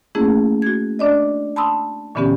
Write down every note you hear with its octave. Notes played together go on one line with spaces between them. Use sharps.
A3 A#3 C#4 E4 G#4
F#4 G#6
D4 D5 D#5
A5 B5 C6 D#6 E6
A#2 D3 E3 B3 C#4 G4